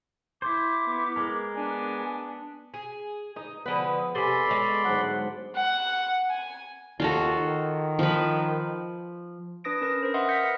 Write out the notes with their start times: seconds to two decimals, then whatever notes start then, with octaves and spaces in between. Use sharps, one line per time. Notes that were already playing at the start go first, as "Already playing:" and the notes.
0.42 E4 C5 D6
0.85 B3
1.16 G#3 A#4
1.54 B3 D4 G#5
2.74 G#4
3.36 D#4 D#5
3.66 D3 F3 B3 G#4 B4
4.15 C3 A4 D5 G#5 B5 C6
4.49 G#3 C#5
4.85 G#2 D3 F#3 F#5
5.56 F#5
6.30 G#5
7.00 D#2 F4 F#4 A4
7.36 D#3
7.99 F3 B4
9.64 D4 B4 D#6 A#6 D7
9.81 C#4 A#4 B4 A#6
10.03 A#4 C5
10.14 D#5 E5 F#5 C6 D#6
10.28 F6 G6 A#6 B6 C#7
10.41 B4 C#7